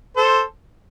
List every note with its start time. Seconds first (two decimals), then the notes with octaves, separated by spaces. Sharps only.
0.17 A4 C5